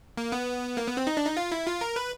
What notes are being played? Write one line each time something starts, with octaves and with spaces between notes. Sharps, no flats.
A#3
B3
A#3
B3
C4
D#4
D4
D#4
F4
E4
F4
A#4
B4